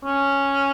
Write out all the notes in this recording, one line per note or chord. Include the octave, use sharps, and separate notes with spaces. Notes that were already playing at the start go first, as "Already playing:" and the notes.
C#4